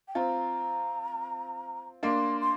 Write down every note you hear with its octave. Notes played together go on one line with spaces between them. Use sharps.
G5
C4 F4 A#5
A#3 D4 C6
C6